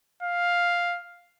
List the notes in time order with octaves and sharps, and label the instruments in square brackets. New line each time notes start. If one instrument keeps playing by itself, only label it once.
[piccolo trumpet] F5